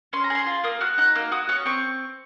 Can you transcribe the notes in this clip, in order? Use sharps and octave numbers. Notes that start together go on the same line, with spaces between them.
C#4 C6
A#5
G#4 C6
F4
A#3 D#6
F#4 F6
D#4 F#6
A#3 F6
F#4 D#6
C#4 C#6
C4 C#6